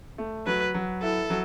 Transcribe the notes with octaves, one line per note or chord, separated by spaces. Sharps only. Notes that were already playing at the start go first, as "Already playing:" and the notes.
A3
F#3 B4
F#3
E4 A4
F#3